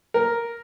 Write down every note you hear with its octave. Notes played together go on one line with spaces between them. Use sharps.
A#4